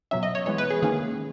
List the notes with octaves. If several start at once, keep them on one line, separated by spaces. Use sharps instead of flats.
B2 F#3 C#4 E5
D#5
C#5
E3 G#3 B3 C#5
B4
G#4
D#3 A#3 C#4 G#4